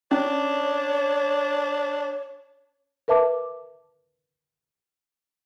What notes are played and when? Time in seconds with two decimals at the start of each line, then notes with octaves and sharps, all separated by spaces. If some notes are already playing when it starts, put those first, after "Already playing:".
0.11 C#4 D4 C#5
3.08 A#4 B4 E5 A5 D6